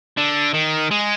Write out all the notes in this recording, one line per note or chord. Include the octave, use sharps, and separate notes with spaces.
D3
D#3
G#3